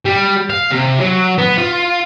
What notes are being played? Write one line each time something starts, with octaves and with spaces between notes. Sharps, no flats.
G3
F5
C3
F#3
B3
F4